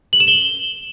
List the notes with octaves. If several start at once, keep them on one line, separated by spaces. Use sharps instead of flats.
F#7
E7
G7